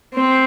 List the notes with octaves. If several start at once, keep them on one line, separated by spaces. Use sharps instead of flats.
C4